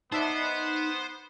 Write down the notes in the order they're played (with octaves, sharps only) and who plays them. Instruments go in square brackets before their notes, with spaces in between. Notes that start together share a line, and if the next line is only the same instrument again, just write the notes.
[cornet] B3 [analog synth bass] D#4 [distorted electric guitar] C5 [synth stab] D5 E5 A5